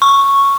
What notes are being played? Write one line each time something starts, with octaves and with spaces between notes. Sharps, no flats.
C#6